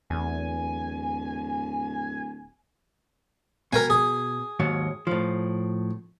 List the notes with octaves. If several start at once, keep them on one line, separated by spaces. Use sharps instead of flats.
D1 E2 G#5
B2 A#4 G5 G#5
G#4
D#2 G#2 F#3
A2 F3